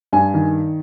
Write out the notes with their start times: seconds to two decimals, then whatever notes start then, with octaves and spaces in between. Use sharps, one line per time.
0.13 G2 G#5
0.34 D#3